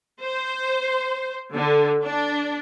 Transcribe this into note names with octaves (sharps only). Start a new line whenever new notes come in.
C5
D3
D4